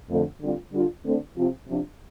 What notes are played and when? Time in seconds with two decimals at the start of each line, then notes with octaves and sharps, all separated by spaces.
0.10 F2 D3 A3
0.41 D3 G3 C4 F4
0.73 D3 G3 D4 F4
1.05 D3 A3 C4
1.37 C3 F3 C4 F4
1.68 C3 F3 D4